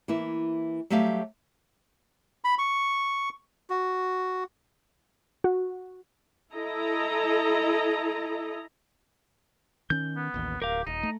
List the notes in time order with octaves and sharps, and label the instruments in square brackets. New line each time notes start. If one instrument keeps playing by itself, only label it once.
[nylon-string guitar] E3 A#3 E4
F#3 G3 A3 G4 F5
[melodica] B5
C#6
F#4
[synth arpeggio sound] F#4
[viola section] E4 A4 D#5 A#5
[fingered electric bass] D#3 C#4 [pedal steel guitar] G6
[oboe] B3
[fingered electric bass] A1 D#2
[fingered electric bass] D1 [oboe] G4 [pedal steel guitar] A#4 F5
[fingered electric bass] D#1 [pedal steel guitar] D#4 [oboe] A#5
[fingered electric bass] A3